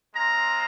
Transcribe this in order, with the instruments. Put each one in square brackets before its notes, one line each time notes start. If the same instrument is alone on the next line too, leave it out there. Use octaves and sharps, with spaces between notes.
[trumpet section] G#3 C4 F4 A#5